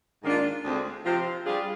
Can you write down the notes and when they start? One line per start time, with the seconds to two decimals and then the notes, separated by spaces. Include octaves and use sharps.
0.23 G#2 D#3 A#3 D4 F4
0.64 D2 D3 G#3 C4
1.05 C3 F3 C4 F4
1.45 G3 D4 F4 G#4